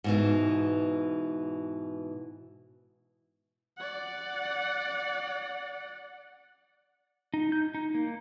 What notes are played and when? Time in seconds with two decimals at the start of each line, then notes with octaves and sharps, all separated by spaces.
0.04 G#2 B2 E3
3.77 D5 F#5
7.34 D#4
7.52 G6
7.74 D#4
7.95 A#3